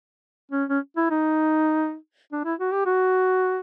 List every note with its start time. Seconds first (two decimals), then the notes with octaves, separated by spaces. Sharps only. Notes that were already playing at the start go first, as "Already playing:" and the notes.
0.51 C#4
0.69 C#4
0.97 E4
1.10 D#4
2.32 D4
2.45 E4
2.59 F#4
2.72 G4
2.86 F#4